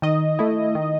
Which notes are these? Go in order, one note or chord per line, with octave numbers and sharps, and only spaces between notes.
D#3 D#5
A3 E4
D#3